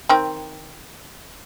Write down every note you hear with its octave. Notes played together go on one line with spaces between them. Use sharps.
D#3 C4